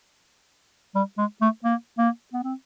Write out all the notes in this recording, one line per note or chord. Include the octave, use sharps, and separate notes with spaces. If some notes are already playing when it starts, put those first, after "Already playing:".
G3
G#3
A3
A#3
A#3
B3
C4